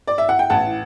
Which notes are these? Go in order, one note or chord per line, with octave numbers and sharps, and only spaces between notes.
D5
E5
F#5
G5
A1 F#5 A5